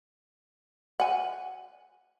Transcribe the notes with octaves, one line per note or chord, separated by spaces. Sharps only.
F#5 G#5